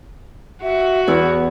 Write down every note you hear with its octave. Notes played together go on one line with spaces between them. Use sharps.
F#4 E5
E2 B3 E4